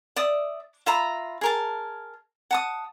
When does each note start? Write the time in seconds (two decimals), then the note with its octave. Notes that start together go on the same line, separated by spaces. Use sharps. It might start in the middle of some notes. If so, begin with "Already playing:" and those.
0.16 D5 E5 D#6
0.86 F4 E5 A#5 B5
1.41 G#4 A#4 A5
2.51 F#5 A5 D#6